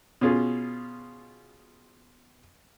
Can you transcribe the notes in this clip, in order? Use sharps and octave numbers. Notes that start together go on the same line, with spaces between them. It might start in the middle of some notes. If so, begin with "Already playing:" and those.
B2 C#4 F4 G#4